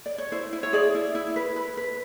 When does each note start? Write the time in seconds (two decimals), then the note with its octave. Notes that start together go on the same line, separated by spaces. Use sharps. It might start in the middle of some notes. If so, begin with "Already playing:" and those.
0.06 D5
0.18 C#5
0.32 E4 C5
0.53 E4
0.63 C#5
0.73 G#4 D5
0.95 E4
1.15 E4
1.36 B4
1.56 B4
1.77 B4